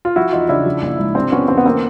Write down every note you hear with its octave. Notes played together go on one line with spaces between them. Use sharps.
F4
F3 E4 F#4
E2 D#4 F4
C#3 D4 E4
F3
A#1
G#2
C3 C4 D4
F3 B3 C#4
E2 C4
B3
D3 A#3 C4